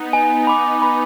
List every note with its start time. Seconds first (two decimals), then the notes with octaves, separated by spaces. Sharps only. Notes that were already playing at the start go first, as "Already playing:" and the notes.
Already playing: B3 D#4
0.13 G#5
0.47 B5 D6
0.82 B5